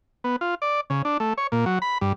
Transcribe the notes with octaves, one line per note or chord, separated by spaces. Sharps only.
B3
F4
D5
C#3
D4
A3
C#5
A#2
F#3
B5
G2